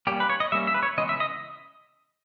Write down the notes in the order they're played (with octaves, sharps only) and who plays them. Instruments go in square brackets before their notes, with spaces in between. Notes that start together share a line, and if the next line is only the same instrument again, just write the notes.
[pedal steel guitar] G3 A#3 C#4 G4
B4
C#5
D#5
G3 A#3 C#4 E5
E5
B4
C#5
C#3 E3 G#3 B3 D#5
E5
D#5